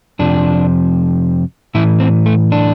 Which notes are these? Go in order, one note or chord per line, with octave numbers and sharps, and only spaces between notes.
F2 C3 F3 D4
A2 E3 E4
C4
A3
D4